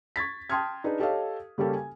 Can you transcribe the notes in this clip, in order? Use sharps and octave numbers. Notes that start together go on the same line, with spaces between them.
C#6 G#6 A6 B6
G5 A5 C6 D#6 F6 G#6
D4 D#4 G#4 B4
G4 A4 C#5 D#5 F5
C#3 G3 A#3 C#4 G4 A4
G#5